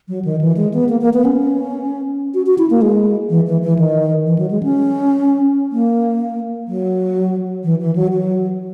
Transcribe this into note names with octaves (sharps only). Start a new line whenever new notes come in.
F#3
D#3
E3
G#3
B3
A#3
A#3
B3
C#4
F#4
F#4
E4
A#3
G#3
E3
E3
E3
D#3
E3
F#3
G#3
C#4
A#3
F#3
E3
E3
F#3
F#3